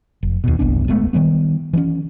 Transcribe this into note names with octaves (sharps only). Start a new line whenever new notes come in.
F1
D#2 B2
F#1 C2 B3 D4
D1 G#3 A3 B3
D#3 E3 G3 B3
E3 C4 C#4